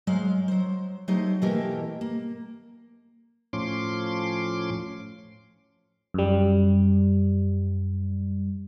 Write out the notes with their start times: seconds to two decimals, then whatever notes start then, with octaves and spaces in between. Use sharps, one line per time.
0.07 F#3 G#3 C5 F5
0.48 F#3 C5
1.08 F#3 A3 D#4 G4 C5 D#5
1.42 B2 E3 A3 A#3 G4 A#4
2.01 A#3
3.53 A2 F3 C#4 C6 D6
6.14 F#2 G3